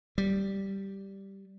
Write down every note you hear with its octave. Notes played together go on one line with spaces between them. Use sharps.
G3